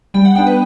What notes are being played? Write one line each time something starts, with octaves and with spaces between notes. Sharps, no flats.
G3 G5
F#5
B3 D4 G5
B4